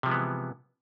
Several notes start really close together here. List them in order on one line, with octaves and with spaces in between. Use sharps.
C3 F3 G#3 B3 E3